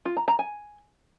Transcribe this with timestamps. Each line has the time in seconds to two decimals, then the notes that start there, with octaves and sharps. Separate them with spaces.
0.05 F4
0.17 A#5
0.28 A#5
0.39 G#5